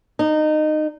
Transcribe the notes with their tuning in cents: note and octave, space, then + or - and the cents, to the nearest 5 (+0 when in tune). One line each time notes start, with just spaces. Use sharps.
D#4 -20